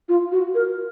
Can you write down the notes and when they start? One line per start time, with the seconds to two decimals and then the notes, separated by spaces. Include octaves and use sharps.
0.09 F4
0.32 F#4
0.54 A#4